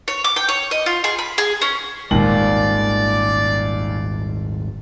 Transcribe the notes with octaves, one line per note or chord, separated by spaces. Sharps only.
C#5
D6
G5
C#5
D#5
F4
G#4
B5
G#4
C#4
D#1 G#1 D#2 A#2 G#3 D5 F#7